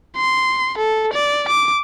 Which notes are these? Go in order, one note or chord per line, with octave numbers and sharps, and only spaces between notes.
C6
A4
D5
D6